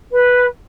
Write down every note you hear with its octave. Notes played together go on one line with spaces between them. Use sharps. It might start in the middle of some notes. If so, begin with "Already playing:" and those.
B4